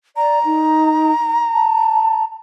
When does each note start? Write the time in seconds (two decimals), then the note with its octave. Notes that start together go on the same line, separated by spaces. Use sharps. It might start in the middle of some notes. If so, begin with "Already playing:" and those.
0.16 D5 A#5
0.45 D#4
1.53 A5